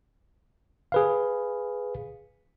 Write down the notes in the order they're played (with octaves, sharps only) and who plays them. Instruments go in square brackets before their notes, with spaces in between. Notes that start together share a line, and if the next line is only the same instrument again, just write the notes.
[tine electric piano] G#4 B4 F5